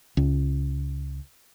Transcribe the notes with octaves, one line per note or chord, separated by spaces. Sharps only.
C#2